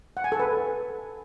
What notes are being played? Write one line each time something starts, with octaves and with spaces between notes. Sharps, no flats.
F#5
G#5
A4
B4